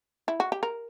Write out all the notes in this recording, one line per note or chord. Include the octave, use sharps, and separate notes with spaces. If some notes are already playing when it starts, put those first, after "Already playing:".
E4
F#4
G4
A#4